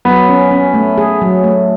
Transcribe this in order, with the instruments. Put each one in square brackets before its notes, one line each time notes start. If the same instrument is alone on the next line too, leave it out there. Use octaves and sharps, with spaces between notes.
[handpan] F#3 [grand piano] B3
[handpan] C#4
C#4
A3
G#4
F#3
A3